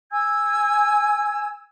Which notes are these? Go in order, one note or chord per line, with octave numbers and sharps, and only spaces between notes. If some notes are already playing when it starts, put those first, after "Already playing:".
G#5 E6 G#6